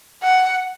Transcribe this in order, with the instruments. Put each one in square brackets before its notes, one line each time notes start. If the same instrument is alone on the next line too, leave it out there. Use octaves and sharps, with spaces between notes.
[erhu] F#5